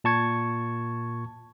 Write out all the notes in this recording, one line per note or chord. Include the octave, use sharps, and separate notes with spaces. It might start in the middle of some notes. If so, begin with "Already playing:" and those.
A#2 A5 C#6 G#6